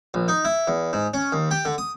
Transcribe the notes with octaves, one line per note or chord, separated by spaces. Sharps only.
A#1
D#4
E4
E2
G#2
C#4
D#2
G4
D3
D#6